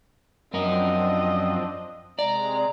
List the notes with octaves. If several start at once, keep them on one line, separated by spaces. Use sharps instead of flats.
F#2 F3 C4 D4 A#4 D#5
C3 G#3 D5 A#5